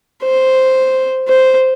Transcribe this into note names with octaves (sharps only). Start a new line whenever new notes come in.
C5
C5